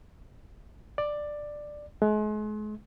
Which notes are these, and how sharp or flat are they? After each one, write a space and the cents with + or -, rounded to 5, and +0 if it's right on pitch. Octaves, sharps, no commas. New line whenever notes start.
D5 +10
G#3 +40